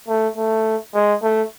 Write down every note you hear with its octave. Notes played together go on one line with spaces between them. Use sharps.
A3
A3
G#3
A3